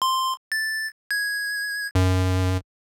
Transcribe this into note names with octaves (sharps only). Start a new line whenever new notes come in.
C6
A6
G#6
F#2